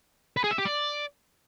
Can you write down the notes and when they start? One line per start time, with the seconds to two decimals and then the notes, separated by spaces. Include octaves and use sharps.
0.37 B4
0.44 G#4
0.51 E5
0.58 G4
0.65 D5